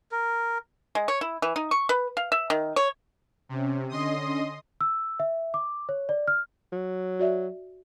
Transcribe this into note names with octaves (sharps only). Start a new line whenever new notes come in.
A#4
G#3
C#5
E4
E3
D#4
C#6
B4
F5
E5
D#3
C#5
C3 C#4
D3 C#4 D#5 C6 D#6
E6
E5
D6
C#5
D5
F6
F#3
F#4 D5 E5